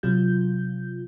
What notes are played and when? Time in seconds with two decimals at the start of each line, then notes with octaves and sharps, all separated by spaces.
0.03 C3 F#3 F4 G6